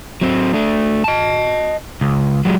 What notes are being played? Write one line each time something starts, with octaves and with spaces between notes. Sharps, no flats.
F#3 C4
A3 D4
D#5 A5
C#2
F#3 G#3